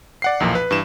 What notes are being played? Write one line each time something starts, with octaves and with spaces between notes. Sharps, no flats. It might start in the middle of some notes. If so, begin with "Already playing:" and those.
D5 F#5 C7
B1 E2 A#2 F3
B4
G2 E3 E7